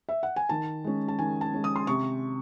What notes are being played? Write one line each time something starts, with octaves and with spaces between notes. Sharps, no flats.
E5
F#5
G#5
D#3 A5
G#3 C#4
A5
D#3 G#5
A5
G#3 C#4
D#6
C6
C3 C#6